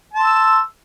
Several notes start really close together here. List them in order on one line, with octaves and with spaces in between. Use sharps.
A5 C6 E6